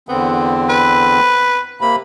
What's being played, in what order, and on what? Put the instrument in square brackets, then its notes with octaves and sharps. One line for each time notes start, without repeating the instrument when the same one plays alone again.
[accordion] E2 D3 C4 [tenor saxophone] B3
[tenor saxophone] B4
[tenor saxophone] C3 [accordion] A#3 B5